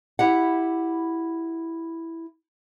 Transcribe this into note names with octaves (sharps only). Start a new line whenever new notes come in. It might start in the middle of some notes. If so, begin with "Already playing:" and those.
E4 G4 F#5